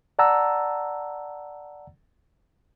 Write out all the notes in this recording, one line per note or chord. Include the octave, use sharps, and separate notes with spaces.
D5 F#5 A5 A#5 E6